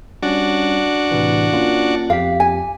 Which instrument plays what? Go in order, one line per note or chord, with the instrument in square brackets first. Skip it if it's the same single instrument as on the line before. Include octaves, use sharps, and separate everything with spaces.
[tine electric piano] G3 C#4 [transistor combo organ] D4 F#4
[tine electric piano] A2 C3 E3
A#3 C#4 F4
[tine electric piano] F2 G4 B6 [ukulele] F5
[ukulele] G#5